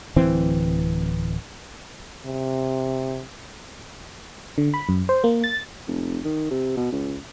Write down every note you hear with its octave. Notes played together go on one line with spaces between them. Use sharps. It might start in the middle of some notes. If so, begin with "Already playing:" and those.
D1 E3 C4
C3
D3
B5
F#2
C5
A#3
A6
F1
D#3
C3
B2
C#2